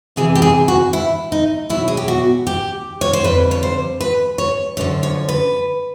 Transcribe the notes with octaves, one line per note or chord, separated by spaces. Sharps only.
F2 C3 E3 G#4
G4
G#4
F#4
E4
D#4
B2 F#3 E4
G#4
G4
F#4
G4
C#5
C5
F2 D3 G3 B4
C#5
C5
B4
C#5
F#2 D3 F3 C#5
C#5
B4